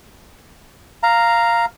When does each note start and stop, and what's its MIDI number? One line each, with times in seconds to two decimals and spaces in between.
1.03 1.65 77
1.03 1.65 82